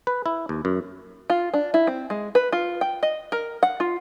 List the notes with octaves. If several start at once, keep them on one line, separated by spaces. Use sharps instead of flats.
B4
E4
D#2
F#2
F4
D4
E4
C4
G#3
B4
F4
G5
D#5
A#4
F#5
F4